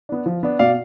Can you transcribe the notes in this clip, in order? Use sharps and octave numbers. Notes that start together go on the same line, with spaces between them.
B3 D4
F3
B3 D4
B2 D5 F5